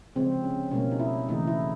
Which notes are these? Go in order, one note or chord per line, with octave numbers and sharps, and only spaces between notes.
C#3 F3 G#3 C4
C#4
B2 G3 A#3 C#4
D#4
E4
C#3 E3 A3 D#4
E4